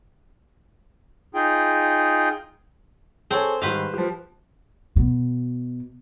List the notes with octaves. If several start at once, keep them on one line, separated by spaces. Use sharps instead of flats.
D#4 F4 G#4 G5
C4 G#4 A4 C5 C#5
G#2 D#3 G3 B4 C5 F5
F3 G4
B2